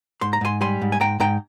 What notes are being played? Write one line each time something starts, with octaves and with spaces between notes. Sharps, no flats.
G#2 C6
A#5
G#2 G#5 C6
G3 G#5 C6
G#2
G#5
G#2 G5 A#5
G#2 G5 A#5